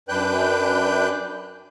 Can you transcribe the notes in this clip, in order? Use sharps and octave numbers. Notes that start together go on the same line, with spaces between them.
F#2 D4 B4 G5 F#6 G6